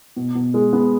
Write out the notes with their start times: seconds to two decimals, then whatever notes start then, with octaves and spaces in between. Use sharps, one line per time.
0.16 B2
0.35 B2
0.54 G#3
0.73 B3